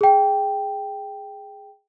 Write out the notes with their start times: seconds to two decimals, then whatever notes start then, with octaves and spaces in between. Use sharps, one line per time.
0.01 G#4 G5